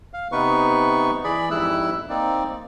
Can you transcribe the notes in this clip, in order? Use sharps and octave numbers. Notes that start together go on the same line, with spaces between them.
F5
C3 B3 D#4 B4 C#6
E3 G#4 D5 B5
F2 G#2 G3 E4 E6 F#6
A#3 C4 D#4 D5